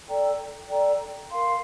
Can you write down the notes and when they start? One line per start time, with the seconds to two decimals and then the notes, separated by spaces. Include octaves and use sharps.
0.08 A4 D5 G5 A#5
0.69 A4 D5 G5 A#5
1.31 A#4 F5 C6